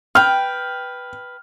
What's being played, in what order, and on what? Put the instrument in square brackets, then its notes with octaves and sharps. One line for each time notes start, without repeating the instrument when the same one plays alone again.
[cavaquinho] B4 G5 [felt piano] F6